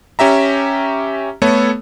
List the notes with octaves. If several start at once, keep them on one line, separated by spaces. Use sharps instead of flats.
C#4 G4 E5 A#5
A3 B3 A4 C#5